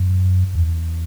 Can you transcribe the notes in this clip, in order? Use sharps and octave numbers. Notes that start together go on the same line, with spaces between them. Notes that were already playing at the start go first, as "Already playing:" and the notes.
Already playing: F#2
E2